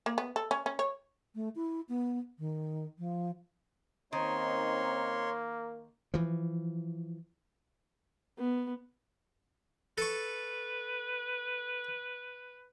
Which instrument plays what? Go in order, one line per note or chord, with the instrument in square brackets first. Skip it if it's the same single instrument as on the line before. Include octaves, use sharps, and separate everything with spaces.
[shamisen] A#3
B3
A4
C#4
C#4
C#5
[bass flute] A3
E4
B3
D#3
F3
[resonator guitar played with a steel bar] D#3 [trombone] A#3 [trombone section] C4 C#4 D#4 [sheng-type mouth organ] C#5 C6
[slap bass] E3 F3
[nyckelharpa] B3
[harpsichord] A4 C#6 [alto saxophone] B4